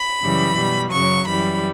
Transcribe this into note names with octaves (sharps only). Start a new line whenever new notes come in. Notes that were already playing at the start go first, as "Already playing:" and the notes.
Already playing: B5
F#2 C#3 E3 G3
B2 G3
F#2 C#3 F#3 C#6
F#2 E3 G3 B5